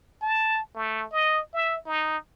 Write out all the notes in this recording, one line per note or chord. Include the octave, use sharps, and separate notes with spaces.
A5
A3
D#5
E5
D#4